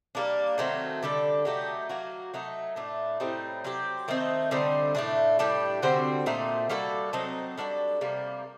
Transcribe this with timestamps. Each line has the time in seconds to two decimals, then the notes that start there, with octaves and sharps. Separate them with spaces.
0.15 G3 A#3 D4
0.58 D#3 F#3 A3 C4
1.03 D3 G3 D4 A4
1.45 F#3 A3 D#4 G4
1.89 F#3 A#3 F#4
2.34 F#3 A3 D#4
2.76 A2 A3 D4
3.20 A2 G3 C4 D#4
3.64 F#3 C4 G4
4.08 D#3 A3 C4 D#4
4.51 D3 G3 C4 D#4
4.95 A2 A3 D4
5.39 A2 G3 D4 G4
5.82 D3 G3 C4 F#4
6.26 A#2 A3 C4 D#4
6.69 G3 A#3 F#4 A4
7.13 F#3 C4 D#4 A4
7.58 G3 D4 F#4 A4
8.01 C3 G3 A#3